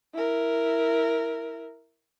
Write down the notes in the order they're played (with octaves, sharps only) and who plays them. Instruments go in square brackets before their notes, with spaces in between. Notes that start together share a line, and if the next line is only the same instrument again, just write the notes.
[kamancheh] E4 A#4